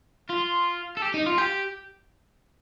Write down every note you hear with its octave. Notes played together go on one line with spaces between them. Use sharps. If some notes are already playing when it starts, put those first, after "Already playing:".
F4
A4
G4
D#4
F4
G4